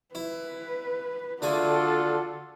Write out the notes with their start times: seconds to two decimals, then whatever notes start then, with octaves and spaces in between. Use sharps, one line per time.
0.15 E4 B4
1.42 D3 A3 D4 F4 F#4 G#4 A4